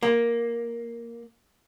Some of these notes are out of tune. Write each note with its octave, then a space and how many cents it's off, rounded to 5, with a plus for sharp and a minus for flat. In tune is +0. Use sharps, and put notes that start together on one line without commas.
A#3 +5